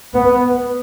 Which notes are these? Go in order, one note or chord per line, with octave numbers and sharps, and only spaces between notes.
B3 B4
B4